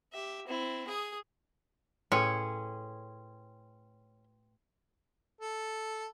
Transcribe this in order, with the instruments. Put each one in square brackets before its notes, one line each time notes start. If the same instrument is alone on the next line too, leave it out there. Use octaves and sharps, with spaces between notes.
[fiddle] G4 E5
C4 E4
G#4 D#6
[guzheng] A2 [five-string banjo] C#4 G#4 [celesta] B4 G5 C6 [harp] C#7
[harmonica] A4